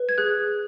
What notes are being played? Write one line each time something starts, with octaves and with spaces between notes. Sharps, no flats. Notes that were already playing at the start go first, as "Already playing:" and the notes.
Already playing: B4
G#6
G#4 F#6